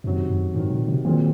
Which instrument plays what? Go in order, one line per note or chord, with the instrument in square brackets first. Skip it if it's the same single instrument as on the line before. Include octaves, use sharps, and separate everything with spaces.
[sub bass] F#2 [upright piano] C3 D#3 F#3
[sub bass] F#2
[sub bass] G#2 [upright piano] C3 D#3 F#3
[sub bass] A#2
C3
[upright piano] A#2 F#3 C4 F4 G#4 [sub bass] D#3